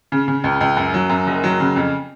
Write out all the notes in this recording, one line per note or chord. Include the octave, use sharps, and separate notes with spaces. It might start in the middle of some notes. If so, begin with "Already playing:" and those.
C#3
C#3
C#2
C#2
F#2
F#3
F#2
F#1
F#3
C#3
F2